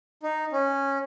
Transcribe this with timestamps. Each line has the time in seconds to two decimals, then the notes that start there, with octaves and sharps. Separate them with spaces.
0.23 D#4
0.53 C#4